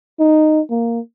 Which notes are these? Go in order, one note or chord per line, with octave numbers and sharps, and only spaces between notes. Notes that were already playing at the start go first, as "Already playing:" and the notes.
D#4
A#3